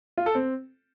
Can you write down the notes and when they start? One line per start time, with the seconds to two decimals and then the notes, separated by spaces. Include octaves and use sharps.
0.17 F4
0.26 A4
0.35 C4